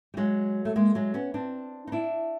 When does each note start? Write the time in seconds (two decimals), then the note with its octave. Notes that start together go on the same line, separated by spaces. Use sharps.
0.14 G3
0.17 F#3 G#3
0.65 A3
0.76 G#3 A#3
0.95 F#3 G#3
1.14 B3 C#4
1.34 C4 D4
1.87 D#4
1.92 D4 E4